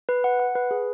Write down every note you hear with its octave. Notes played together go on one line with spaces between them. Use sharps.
B4
F#5
F#5
B4
G#4